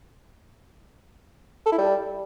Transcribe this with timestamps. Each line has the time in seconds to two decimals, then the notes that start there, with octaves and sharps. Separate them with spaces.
1.66 A4
1.72 E4
1.78 G3